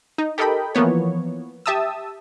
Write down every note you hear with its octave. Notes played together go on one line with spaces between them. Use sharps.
D#4
G4 A4 A#4 D#5 G5 B5
E3 F3 A#3 B3 C#5
G4 E5 A5 D#6 E6